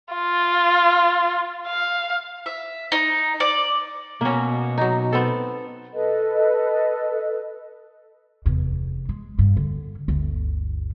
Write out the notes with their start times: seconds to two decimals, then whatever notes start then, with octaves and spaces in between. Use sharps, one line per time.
0.14 F4
1.67 F5
2.46 E5
2.92 D#4
3.40 D5
4.21 B2 A#3 C#4 F#4
4.78 F#3 D#4
5.13 B3 C4 A4
5.94 A4 B4 D#5
8.46 F1 E2
9.09 G#3
9.39 G2
9.57 D3
10.08 G1 D2